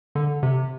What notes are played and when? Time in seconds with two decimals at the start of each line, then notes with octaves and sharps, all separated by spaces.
0.15 D3
0.43 C3